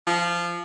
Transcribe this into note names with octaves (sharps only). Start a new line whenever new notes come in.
F3